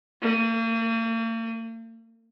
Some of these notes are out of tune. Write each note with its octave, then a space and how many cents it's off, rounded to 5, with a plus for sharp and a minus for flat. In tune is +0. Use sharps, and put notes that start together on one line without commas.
A#3 -45